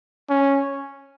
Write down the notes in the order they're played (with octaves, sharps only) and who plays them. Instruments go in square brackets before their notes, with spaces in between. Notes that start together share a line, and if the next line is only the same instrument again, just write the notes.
[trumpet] C#4